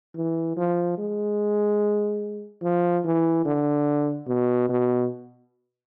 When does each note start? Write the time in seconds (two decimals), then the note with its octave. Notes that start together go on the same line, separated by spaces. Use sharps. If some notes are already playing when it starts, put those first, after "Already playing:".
0.16 E3
0.57 F3
0.98 G#3
2.63 F3
3.05 E3
3.45 D3
4.28 B2
4.69 B2